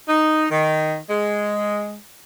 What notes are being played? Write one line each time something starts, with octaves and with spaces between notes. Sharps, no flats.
D#4
D#3
G#3